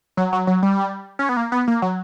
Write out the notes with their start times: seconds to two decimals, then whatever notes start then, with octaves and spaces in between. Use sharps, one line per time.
0.17 F#3
0.33 F#3
0.47 F#3
0.63 G3
1.19 C#4
1.29 B3
1.37 A#3
1.52 B3
1.68 A#3
1.82 F#3